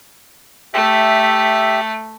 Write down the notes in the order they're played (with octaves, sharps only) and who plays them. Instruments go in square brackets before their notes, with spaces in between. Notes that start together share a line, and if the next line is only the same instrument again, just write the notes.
[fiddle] A3 [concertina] G4 E5